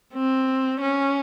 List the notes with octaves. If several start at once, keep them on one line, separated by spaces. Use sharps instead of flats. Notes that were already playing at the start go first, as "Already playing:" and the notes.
C4
C#4